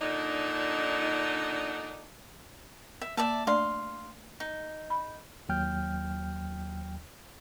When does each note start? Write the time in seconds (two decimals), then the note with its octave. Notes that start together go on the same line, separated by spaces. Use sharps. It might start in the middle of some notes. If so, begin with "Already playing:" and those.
0.01 A#2 D3 D4 D#4
3.01 E5
3.17 A#3 D5 E5 A5
3.47 A3 D4 D5 F5 C6
4.40 D#4
4.90 B5
5.49 D#2 F#3 G5 F6 G6